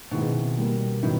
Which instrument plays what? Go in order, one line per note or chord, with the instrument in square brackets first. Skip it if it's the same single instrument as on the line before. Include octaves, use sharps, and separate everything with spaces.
[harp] B2 [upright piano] D#3 G#3 C4 E4
[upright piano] A#2 G3 A#3
[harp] A2 [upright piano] C3 D#3 F#3 B3 E4